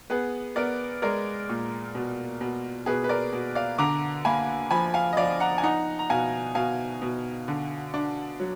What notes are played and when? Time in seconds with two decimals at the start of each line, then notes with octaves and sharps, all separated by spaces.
0.10 B3 G#4 B4
0.56 B3 A#4 D5
1.02 G#3 A#4 D5
1.49 A#2
1.95 B2
2.41 B2
2.86 B2 G#4 B4
3.04 B4
3.09 A#4 D5
3.32 B2
3.55 D5 F5
3.78 D3 A#5 D6
4.25 A#3 G#5 B5
4.71 F3 G#5 B5
4.94 F5 G#5
5.13 D#5
5.17 F3 D5 F5
5.40 F#5 A#5
5.58 G#5
5.63 D#4 F#5 A#5
5.99 A#5
6.10 B2 F5 G#5
6.55 B2 F5 G#5
7.02 B2
7.48 D3
7.94 D4
8.40 F#3